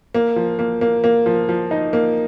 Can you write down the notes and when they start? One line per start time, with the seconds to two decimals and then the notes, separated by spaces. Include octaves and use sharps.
0.14 A#3
0.36 F3
0.59 A#3
0.81 A#3
1.04 A#3
1.26 F3
1.49 F3
1.71 D#4
1.93 A#3